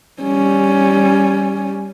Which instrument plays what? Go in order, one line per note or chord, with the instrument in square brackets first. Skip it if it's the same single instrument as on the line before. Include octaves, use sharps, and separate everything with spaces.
[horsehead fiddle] G3 C#4